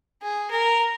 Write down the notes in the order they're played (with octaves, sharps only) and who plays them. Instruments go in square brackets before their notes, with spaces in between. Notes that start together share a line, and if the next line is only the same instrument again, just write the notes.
[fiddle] G#4
A#4